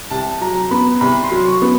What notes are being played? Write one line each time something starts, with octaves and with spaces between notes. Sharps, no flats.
C2 A5
F#3 A#5
B3 B5
C2 B5
C6
F#3
C#6
B3